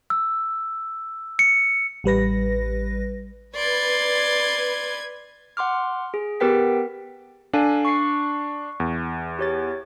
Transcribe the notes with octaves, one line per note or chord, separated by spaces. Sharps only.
E6
C#7
A1 G3 B4 A#6
B4 D5 C6 G#6
F#5 C6 D6 F6
G#4
B3 G4 A#4 B4 G5 B6
D4 A4 F5 G#5
C#6 C7 C#7
E2
G4 C#5 A6